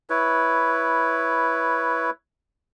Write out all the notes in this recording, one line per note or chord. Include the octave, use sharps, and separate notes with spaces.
E4 B4 C#5